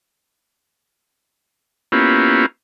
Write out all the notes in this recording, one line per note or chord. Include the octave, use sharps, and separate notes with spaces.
A#3 B3 C#4 E4 F4 G4